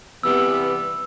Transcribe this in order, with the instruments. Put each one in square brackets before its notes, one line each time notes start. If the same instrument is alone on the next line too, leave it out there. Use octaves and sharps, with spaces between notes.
[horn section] C3 E3 G3 B3 [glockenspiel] E6